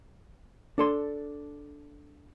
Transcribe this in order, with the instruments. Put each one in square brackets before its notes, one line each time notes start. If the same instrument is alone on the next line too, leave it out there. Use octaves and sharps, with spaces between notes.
[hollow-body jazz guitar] D4 A4 C6